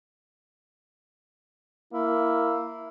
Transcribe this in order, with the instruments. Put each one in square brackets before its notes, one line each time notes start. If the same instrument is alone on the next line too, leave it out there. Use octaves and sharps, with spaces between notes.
[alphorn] A#3 [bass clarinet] E4